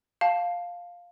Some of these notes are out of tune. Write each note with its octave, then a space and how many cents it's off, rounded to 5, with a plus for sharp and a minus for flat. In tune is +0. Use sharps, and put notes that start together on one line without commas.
F5 +5 A5 +0